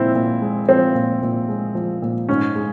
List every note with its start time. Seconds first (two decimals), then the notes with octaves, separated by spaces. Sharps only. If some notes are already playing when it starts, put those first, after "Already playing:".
Already playing: A#2 F3 G#3 C4 E4
0.15 A#2
0.42 G#3
0.69 F3 C4
0.95 A#2
1.22 A#2
1.49 G#3
1.75 F3
2.02 A#2
2.29 G#2 C#4
2.55 G#3